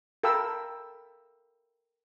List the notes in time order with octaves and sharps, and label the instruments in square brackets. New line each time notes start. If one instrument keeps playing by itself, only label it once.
[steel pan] A4 A#4 F5 G5 B5 E6